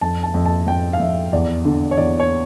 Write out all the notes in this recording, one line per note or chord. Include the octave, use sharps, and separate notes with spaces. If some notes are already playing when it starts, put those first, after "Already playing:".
F2 A5
A5
F2
A5
F2 G5
F5
F2 E5
E2 D5
D3
C#5
E2 D5
C#5